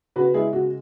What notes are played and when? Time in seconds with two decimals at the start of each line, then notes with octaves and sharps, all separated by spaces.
0.16 C#3 F#4 B4
0.34 G#3 E4 G#4
0.53 C#3 F#4